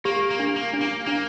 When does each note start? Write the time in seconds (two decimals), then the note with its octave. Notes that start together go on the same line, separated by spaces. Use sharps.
0.05 A#3 G4
0.31 A#3
0.39 D4
0.56 A#3
0.73 D4
0.81 A#3
1.06 A#3 D4